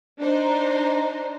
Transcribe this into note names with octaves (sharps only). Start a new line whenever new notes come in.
D4 D#4 C5